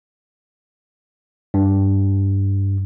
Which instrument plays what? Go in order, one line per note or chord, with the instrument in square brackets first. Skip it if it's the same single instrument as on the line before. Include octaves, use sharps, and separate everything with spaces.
[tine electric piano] G2